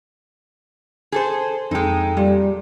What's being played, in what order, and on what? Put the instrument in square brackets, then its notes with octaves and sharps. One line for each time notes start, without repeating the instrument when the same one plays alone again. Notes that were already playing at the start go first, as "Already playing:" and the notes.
[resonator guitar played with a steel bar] G#4 A4 C5
[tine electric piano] F2 A4 G5 [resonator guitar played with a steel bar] G#3 D#4
[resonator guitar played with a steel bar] A#2 [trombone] G3